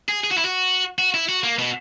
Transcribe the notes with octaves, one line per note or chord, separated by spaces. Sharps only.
G#4
G#4
F#4
E4
F#4
F#4
E4
F#4
A#3
B2